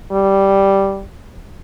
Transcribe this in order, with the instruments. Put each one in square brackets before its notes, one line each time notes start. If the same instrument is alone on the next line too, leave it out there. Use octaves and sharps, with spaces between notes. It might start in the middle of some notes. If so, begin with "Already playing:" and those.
[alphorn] G3